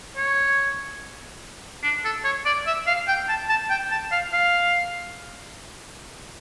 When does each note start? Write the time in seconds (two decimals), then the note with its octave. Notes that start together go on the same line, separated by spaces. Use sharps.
0.17 C#5
1.83 D4
2.05 A4
2.24 C#5
2.46 D5
2.66 E5
2.87 F5
3.08 G5
3.29 A5
3.49 A5
3.70 G5
3.91 A5
4.11 F5
4.32 F5